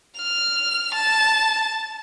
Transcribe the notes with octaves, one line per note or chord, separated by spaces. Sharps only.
F6
A5